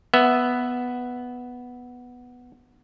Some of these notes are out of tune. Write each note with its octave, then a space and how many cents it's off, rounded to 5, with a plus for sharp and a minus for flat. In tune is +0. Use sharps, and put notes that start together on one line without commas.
B3 +0 E5 +0